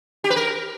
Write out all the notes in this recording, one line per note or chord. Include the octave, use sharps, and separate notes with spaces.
G4
B4
A#4